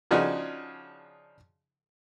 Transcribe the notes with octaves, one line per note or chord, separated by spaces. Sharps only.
C#3 F3 D4 D#4 F#4 G#4